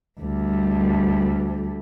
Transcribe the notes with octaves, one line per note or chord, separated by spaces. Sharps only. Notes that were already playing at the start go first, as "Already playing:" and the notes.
D2 G3